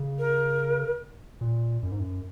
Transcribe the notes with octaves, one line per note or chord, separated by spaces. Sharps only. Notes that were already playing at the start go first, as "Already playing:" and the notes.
Already playing: C#3
A#4
A#2
F#2
G#2
F#2